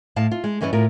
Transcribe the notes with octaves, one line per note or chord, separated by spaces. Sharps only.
A2 F5 A5
F4
G#3
G2 E3 C#4 D5 D#5
A2 F4 A#4